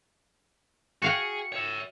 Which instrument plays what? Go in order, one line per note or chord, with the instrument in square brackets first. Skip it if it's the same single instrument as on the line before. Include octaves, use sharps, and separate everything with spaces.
[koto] F#4 F5 G5 [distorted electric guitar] G#4 [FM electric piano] C#7
[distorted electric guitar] C#5 E5